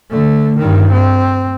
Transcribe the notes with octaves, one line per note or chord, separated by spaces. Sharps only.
D3 A3
G2 D#3
C4